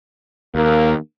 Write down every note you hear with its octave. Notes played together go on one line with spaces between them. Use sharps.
D#2 A#3